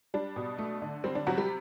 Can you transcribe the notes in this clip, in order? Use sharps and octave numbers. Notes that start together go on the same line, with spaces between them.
G3 D4
B2
A3
D3
G3 C4
D4
C3 F#3 F#4
G3 G4